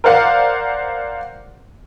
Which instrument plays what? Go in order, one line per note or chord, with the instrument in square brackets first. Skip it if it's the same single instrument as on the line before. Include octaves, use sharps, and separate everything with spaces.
[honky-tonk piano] A#4 C5 D5 F5 F#5